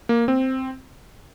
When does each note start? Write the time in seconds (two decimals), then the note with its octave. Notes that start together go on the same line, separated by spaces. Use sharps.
0.09 A#3
0.28 C4